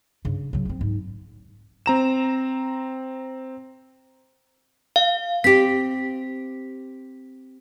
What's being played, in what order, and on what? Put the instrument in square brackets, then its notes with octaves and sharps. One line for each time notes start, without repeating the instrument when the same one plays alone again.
[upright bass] G2 C#3
C#3 F#3
A#3 C4
G#2
[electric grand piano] C4 A#5 E7
[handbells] F5
[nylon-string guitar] C4 G4 [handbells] B6